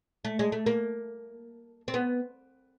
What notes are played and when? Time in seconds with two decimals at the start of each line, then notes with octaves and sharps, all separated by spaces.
0.25 A3
0.39 G#3
0.52 A3
0.66 A#3
1.88 C4
1.94 B3